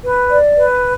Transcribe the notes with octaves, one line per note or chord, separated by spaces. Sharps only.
B4
D5
B4